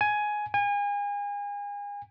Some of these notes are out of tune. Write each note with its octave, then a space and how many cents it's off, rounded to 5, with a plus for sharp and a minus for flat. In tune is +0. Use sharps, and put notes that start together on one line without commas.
G#5 +10
G#5 -35